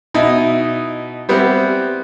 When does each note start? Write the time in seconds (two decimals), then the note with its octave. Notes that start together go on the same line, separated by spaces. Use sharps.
0.14 B2 D#4 E4
1.29 G3 B3 C4 E4